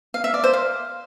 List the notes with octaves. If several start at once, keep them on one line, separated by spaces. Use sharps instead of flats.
F5
E5
D5
C5
F5